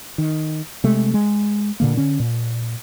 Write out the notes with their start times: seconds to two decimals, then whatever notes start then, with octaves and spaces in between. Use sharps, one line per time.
0.18 D#3
0.84 C3 G#3 A3
1.14 G#3
1.80 A#2 D3 A#3
1.97 D3 C#4
2.20 A#2